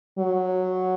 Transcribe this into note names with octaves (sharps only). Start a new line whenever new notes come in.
F#3